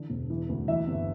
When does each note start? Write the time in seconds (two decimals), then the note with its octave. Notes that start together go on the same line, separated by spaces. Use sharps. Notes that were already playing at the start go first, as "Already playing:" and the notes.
Already playing: D3 E3
0.10 E1
0.30 E3
0.49 D2
0.68 E3 E5
0.88 G1